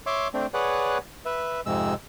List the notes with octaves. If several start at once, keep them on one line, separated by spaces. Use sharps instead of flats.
C#5 E5 C6 D6
A3 C4 D4
G#4 B4 C#5 D5 F#5
B4 E5
F2 G#2 C3 G#3 E6